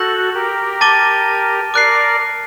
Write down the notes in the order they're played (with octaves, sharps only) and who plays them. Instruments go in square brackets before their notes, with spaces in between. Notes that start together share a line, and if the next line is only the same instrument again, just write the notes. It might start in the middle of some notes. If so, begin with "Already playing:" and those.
Already playing: [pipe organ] F#4 A4 [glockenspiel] G6 A#6 F#7
[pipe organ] G4 A#4
[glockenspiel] A5 D6 A6 D#7 G7
[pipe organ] A#4 D5 [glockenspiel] D6 F#6 C7